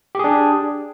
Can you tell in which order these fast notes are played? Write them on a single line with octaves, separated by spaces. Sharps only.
G4 G#4 D4